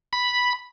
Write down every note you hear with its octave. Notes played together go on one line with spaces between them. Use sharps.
B5